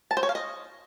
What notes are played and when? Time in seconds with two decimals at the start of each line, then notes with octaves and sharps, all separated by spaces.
0.11 A5
0.17 C5
0.23 C#5
0.29 F5
0.35 D#5